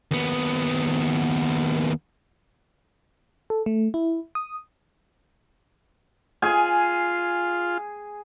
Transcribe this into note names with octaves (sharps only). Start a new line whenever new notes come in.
D#2 B3
A4
A3
E4
D#6
F4 G#4 G#5